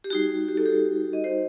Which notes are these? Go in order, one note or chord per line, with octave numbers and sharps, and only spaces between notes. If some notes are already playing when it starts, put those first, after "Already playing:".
G4
G3 D#4 F#4
G4
A4
G4
D#5
C5